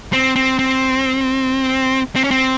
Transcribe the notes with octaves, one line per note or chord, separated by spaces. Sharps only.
C4
C4
C4
C4
C#4
C4